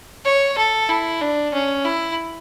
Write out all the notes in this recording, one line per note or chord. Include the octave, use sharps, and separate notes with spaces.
C#5
A4
E4
D4
C#4
E4